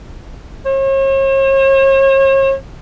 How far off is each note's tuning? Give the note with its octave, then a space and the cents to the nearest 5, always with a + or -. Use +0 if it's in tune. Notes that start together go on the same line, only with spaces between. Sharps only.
C#5 -45